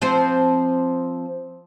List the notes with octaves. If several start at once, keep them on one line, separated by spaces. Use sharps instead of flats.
F3 C4 C5